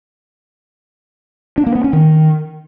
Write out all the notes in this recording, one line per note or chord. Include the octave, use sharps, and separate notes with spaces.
D4
A#3
B3
C#4
D#3